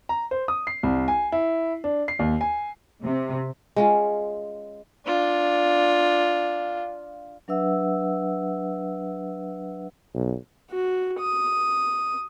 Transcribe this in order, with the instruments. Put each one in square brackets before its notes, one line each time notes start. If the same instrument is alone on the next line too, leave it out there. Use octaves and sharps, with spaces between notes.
[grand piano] A#5
C5
D#6
C7
C2
G#5
E4
D4
C7
D#2
G#5
[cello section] C3
[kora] G#3 C#4 F4
[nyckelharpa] D4 F4
[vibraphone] F#3 D4 B4 E5 F#5 E6
[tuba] B1
[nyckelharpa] F#4
D#6